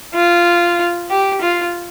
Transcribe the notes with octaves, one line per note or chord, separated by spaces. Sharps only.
F4
G4
F4